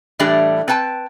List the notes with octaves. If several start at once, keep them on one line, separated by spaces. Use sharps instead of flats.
A2 E3 G3 A3 D4 G4
C4 B4 G5 A5